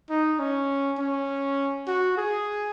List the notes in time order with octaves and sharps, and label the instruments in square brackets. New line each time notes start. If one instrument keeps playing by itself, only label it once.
[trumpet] D#4
C#4
C#4
F#4
G#4